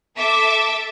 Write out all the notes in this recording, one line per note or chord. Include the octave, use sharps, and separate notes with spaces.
A4 E5 D6